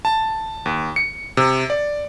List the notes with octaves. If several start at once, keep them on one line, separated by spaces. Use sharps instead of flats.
A5
D#2
C#7
C3
D5